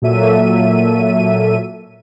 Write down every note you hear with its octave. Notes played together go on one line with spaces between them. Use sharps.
A#2 F#3 A#3 A4 E5 D#7